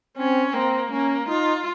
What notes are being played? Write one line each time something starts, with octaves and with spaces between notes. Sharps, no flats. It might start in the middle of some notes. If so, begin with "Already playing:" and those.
C4 C#4
A#3 C4
A#3 C#4
D#4 F4